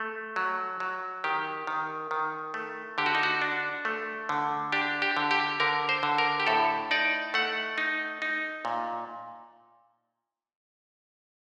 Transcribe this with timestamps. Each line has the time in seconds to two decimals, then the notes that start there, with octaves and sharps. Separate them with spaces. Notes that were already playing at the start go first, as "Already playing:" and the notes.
Already playing: A3
0.36 F#3
0.80 F#3
1.24 D#3 G4
1.67 D#3
2.11 D#3
2.54 A3
2.98 D3 G4
3.06 F#4
3.15 D#4
3.23 F#4
3.41 D4
3.85 A3
4.29 D3
4.72 D4 G4
5.02 G4
5.17 D3
5.31 G4
5.60 D3 A#4
5.89 C5
6.03 D3
6.18 A#4
6.40 G4
6.47 A2 A4
6.91 D#4 D5
7.34 A3 F#5
7.78 D#4
8.22 D#4
8.65 A#2